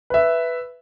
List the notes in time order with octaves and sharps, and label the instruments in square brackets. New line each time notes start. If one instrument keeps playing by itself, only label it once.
[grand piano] B4 E5